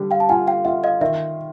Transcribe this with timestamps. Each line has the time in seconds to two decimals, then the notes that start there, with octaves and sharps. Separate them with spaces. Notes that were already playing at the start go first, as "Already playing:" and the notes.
Already playing: D3 G3
0.11 F5 G5
0.20 A5
0.29 F4 F#5 G#5
0.47 F5 G5
0.65 F4 E5 F#5
0.84 D#5 F5
1.01 D#3 D5 E5